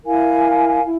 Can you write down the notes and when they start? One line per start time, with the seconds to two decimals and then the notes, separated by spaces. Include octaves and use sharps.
0.05 E4 A#4 F5 G#5
0.82 E4